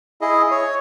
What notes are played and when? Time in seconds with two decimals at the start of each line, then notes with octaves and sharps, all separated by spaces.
0.21 E4 G#4 D#5
0.51 C#5